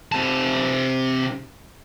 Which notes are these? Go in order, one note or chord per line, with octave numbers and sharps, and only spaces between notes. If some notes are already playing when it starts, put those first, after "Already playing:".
C3 A5